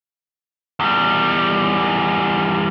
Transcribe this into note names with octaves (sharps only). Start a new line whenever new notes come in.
E2 G3